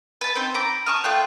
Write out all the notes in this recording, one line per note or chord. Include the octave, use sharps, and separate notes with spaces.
B4 A5
C4 D#4 C5 G6
A#5 B5 D6
A5 C#6 D#6 F6
A3 F4 G5 F#6